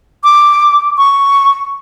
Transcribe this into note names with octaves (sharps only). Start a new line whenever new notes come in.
D6
C#6